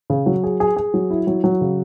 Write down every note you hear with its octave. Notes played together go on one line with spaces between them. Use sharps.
C#3
F#3
G#4
G#4
G#4
F#3
E4
F#3
F#3
C#3